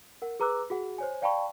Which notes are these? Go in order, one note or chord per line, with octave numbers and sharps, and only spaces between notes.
A#4 F#5
G#4 B4 A#5 D6 E6 F#6
F#4 G#4 F#5
C5 C#5 G#5
D5 F5 G5 A5 B5 C#6